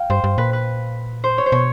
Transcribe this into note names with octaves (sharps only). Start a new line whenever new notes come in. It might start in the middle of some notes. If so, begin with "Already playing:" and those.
Already playing: F5 G5
G2 C5
G2
A#2 B4
B4
C5
C#5
C5
B2 C#5